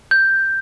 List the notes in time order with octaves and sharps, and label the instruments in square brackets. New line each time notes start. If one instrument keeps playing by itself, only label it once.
[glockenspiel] G6